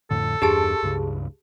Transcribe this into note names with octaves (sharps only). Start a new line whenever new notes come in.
F2 A2 D3 A4
E2 G2 D4 G4 G#4 A5
C#2 G2 C#3